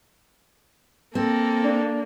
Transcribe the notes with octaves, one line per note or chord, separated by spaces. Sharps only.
A#3 C4 A4
D4